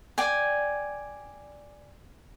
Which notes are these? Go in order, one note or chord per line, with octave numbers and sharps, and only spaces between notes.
D5 G5 G#5